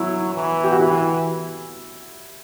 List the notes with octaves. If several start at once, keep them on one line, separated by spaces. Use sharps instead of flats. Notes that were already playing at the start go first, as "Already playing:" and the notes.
Already playing: F#3 E4
E3
G4
F#4
E3 E4